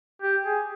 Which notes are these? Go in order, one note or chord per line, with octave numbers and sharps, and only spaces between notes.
G4
G#4